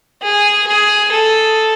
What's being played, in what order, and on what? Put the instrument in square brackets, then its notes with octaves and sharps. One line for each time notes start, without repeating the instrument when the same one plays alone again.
[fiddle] G#4
G#4
A4